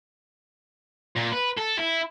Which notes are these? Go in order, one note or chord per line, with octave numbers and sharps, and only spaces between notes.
A#2
B4
A4
E4